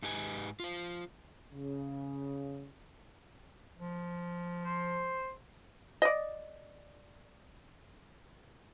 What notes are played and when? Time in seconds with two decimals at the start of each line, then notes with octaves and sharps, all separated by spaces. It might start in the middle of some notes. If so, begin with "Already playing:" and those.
0.02 G#2 D#4 G4 B4 G#5
0.60 F4 C5
1.52 C#3
3.78 F3
4.64 C5
6.02 D5 D#5